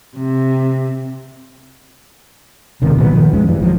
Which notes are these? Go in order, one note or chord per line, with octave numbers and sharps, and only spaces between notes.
C3
E1 G2 C3 D#3
A#2 D#3 F#3 B3
D#3 F3
F2 G#3 C#4
G2 E3
A1 F3 F#3